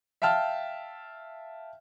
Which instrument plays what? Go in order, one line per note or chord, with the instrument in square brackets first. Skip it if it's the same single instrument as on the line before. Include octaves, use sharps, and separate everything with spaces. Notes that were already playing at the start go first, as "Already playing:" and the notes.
[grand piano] E5 F5 G5 A5 F6